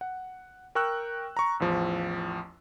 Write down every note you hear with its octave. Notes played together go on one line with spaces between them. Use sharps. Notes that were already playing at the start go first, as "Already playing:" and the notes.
F#5
A#4 G5 C#6 E6 F#6
A#5 C#6
A1 E2 F3